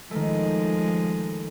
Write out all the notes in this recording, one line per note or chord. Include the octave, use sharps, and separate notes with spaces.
D#3 F3 G#3 A3